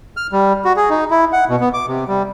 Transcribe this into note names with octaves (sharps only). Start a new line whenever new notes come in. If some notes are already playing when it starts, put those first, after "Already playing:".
F6
G3
F#4
G#4
D#4
E4
F#5
B2
B3
D6
C3
G3